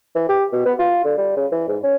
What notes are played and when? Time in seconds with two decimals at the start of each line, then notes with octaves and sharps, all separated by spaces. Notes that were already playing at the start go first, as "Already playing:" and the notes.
0.15 E3
0.28 G4
0.52 B2
0.65 B3
0.79 F4
1.04 D3
1.17 G3
1.36 C#3
1.52 E3
1.68 G#2
1.83 C#4